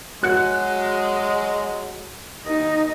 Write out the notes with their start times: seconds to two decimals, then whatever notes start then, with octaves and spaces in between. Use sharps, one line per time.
0.23 F#3 G#3 F#4 F#6 C#7
2.46 D#2 D#4 D#5